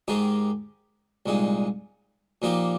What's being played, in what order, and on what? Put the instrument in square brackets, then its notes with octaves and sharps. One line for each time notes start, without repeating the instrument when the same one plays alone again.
[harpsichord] G#2 D#3 G#3 D#4 G4
C2 A#2 G#3 D#4
A#2 F3 A#3 D#4 G4